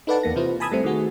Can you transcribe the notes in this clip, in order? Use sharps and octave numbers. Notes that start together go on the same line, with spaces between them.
D#4 A4 B4 D5 F#5 A5
E2 A#3 A#6
C3 E3 E4 F4 B4 C5
G#5 A5 B5 D#6 E6 G#6
G3 A3 C4
D#3 A3 F#4 G#4